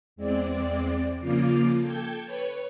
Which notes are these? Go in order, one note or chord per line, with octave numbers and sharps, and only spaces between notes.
E2 G#3 C4 D5
C#3 F3 A#3 F4 D6
A4 G5 G6 G#6
B4 C#5